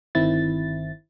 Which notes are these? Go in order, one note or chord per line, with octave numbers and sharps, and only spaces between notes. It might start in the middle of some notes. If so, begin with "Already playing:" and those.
G1 D#3 C4 E4 A6